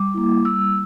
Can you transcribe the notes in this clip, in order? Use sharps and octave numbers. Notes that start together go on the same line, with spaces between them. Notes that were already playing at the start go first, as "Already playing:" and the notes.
Already playing: G3 D6
A#3 E4
G3 E6